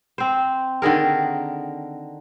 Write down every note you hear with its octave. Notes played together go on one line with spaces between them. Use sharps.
C4 C5
D3 D#3 G#4 A#4